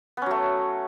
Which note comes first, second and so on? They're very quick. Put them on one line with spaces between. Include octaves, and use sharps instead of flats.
B3 C#4 F#3 A3